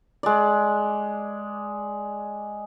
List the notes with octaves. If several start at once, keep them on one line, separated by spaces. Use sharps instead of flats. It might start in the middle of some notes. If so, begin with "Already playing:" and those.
G#3 D5